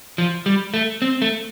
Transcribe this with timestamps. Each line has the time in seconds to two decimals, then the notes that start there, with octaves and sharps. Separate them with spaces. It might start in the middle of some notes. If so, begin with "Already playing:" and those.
0.18 F3
0.46 G3
0.74 A3
1.02 C4
1.22 A3